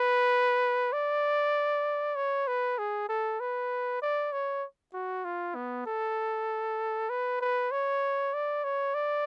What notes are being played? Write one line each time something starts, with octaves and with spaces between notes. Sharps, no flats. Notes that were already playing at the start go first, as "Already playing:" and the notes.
Already playing: B4
D5
C#5
B4
G#4
A4
B4
D5
C#5
F#4
F4
B3
A4
B4
B4
C#5
D5
C#5
D5